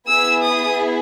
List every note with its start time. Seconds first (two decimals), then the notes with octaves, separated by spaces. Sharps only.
0.11 B3 E4 G#4 E6
0.44 D#6